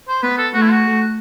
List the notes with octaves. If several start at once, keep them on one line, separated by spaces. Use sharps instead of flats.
C5
B3 B4
A4
A3 F#4
E4
F#4